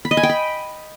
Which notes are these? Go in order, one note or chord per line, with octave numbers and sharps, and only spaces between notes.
B5
D#5
G#5
G5
B5